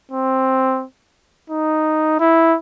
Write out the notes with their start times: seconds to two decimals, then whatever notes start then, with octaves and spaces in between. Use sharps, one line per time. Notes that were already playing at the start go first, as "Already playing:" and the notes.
0.11 C4
1.50 D#4
2.20 E4